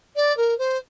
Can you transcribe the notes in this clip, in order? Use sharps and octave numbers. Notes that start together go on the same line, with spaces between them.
D5
A#4
C5